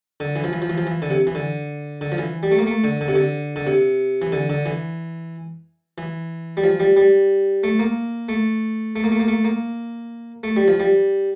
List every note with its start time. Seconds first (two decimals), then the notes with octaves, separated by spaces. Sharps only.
0.20 D3
0.36 E3
0.44 F3
0.53 E3
0.62 F3
0.70 E3
0.78 F3
0.87 E3
1.02 D3
1.10 C3
1.27 E3
1.35 D3
2.01 D3
2.12 F3
2.18 E3
2.43 G3
2.51 A3
2.59 A#3
2.67 A3
2.84 D3
3.01 D3
3.08 C3
3.15 D3
3.56 D3
3.67 C3
4.22 E3
4.32 D3
4.50 D3
4.66 E3
5.98 E3
6.57 G3
6.64 F3
6.80 G3
6.97 G3
7.63 A3
7.79 A#3
8.29 A3
8.96 A3
9.04 A#3
9.12 A3
9.20 A#3
9.28 A3
9.44 A#3
10.43 A3
10.56 G3
10.68 F3
10.80 G3